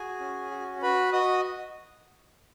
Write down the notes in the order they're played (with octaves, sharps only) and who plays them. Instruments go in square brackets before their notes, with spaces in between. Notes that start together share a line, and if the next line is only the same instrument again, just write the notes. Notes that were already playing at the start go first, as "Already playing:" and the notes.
Already playing: [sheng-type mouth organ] F#4 G#4 G#5
C#4
F#4
F#4 B4 B5
F#4 D#5 D#6